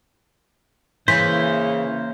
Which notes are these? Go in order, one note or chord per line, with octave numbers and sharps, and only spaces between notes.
C#3 E3 A#3 C5 B6